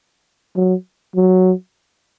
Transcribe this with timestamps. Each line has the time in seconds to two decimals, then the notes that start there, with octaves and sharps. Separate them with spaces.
0.56 F#3
1.15 F#3